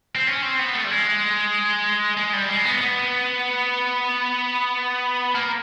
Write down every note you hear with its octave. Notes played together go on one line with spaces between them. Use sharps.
C4
C#4
C4
B3
A3
G3
G#3
G#3
G3
G#3
B3
B3
A#3